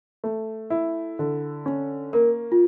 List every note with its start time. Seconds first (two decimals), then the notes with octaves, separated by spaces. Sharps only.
0.24 A3
0.70 E4
1.19 D3
1.66 C#4
2.13 A#3 A#4
2.52 F4